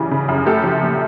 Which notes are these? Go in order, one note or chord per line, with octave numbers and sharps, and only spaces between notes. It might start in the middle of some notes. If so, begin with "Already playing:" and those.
Already playing: F#2 C#3 E3 G3
C#3
F#2
A3 G4 A4
F3
A#2